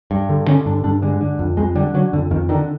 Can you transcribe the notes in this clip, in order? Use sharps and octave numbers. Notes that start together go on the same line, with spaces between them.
G2
D3
D3 C#4
G2 D4
G2 D4
D3 G#3
D3
F2
F2 G#3
D3 G3
D3 F#3
F2 D3
F2 D#3
D3 D#3